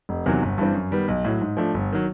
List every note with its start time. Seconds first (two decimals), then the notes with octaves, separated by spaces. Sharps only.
0.09 F1
0.26 E2 C3 D#3 F#3
0.42 G1
0.58 G2 E3 G3 C4
0.74 F#2
0.91 D#3 G3 B3
1.08 B1
1.24 A2 F#3
1.41 G#2
1.57 F3 A3 D4
1.74 G1
1.92 D#3 F#3